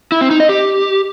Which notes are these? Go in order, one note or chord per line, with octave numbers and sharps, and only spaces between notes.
E4
C4
D#4
D#5
G4